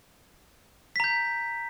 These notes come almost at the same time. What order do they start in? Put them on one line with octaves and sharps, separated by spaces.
B6 A#5 G6